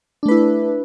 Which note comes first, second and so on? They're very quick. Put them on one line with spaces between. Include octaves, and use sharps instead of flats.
D4 A3 B4 E4